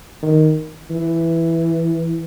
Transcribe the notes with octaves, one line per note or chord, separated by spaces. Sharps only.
D#3
E3